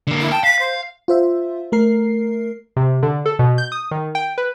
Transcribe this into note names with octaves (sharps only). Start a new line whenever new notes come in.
D3 A#3
E4
G5 A5
F5 B6
C5
F4 C5 E5
A3 A#4 C7
C3
D3
A4
B2
G6
D#6
D#3
G5
B4